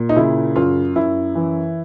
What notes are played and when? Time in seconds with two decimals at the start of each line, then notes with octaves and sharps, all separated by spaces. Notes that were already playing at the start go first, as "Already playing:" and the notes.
Already playing: A#2
0.09 D#4
0.16 C#3 E4
0.56 F#2 F4
0.96 F#2 E4
1.35 E3